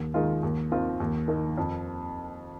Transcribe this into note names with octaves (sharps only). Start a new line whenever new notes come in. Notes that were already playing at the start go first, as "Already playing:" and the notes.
Already playing: D#2
D#3 G#3 F4
D#2
D#3 C4 F4
D#2
D#3 A#3
F2